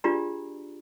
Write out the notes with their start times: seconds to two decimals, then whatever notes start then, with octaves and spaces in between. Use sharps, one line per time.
0.04 D4 F4 G4 G#4 D5 A#5